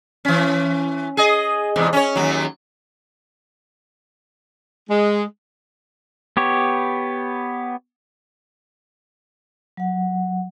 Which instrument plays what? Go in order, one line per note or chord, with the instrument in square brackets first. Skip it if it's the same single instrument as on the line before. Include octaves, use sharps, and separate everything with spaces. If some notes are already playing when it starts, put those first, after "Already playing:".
[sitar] E3 C#4
G#4 D#5
E2 G#2 C3
C#4 C#5
D#2 F#3
[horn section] G#3
[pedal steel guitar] B3 G4 C#5
[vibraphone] F#3 F#5